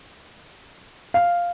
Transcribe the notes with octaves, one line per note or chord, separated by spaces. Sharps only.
F5